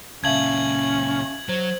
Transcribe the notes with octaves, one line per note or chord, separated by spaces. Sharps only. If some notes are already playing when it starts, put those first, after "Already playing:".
C#2 A#2 C#4 E5 F5 A5 G#6 F#7
F#3 C5